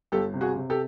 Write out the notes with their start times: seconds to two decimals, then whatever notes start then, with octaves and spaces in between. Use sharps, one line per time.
0.12 G1 G4 A4
0.33 C3
0.41 F#4 G#4
0.56 C3
0.70 G4 A4